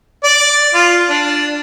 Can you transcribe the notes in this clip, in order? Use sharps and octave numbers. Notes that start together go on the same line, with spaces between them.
D5
F4
D4